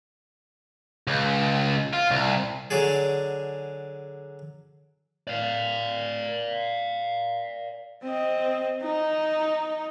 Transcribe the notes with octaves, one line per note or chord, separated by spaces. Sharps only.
C#2
F4
C2
D3 F#3 D4 G#4
D5 F5
C4 D#5
D#4